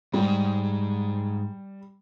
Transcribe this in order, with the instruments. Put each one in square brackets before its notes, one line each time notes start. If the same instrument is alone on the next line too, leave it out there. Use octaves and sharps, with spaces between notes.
[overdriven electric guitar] G#2 [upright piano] G3